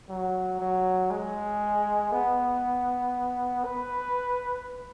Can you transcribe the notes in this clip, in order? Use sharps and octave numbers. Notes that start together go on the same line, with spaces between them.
F#3
F#3
G#3
B3
B4